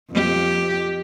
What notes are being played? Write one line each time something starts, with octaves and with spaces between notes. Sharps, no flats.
F2 G4